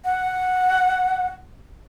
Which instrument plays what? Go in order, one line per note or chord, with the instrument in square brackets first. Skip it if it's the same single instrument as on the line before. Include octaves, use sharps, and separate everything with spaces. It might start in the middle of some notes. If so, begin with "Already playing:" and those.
[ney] F#5